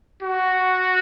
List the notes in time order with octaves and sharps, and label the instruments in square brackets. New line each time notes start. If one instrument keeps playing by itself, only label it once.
[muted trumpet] F#4